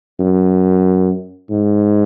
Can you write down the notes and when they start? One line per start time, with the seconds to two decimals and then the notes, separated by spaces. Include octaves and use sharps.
0.20 F#2
1.51 G#2